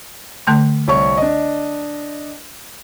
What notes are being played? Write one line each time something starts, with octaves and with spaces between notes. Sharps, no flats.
D3 A3 C6
C2 C#5 C#6
D4 D#5